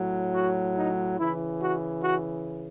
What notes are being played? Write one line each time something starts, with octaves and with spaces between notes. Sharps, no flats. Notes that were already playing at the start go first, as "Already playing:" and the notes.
Already playing: A2 F#3
F#4
D#4
C#3 E3 E4
F#4
F#4